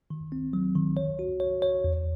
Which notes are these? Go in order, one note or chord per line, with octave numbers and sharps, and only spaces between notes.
D#3
C4
F#3
D#3
C#5
F#4
C#5
C#5
E2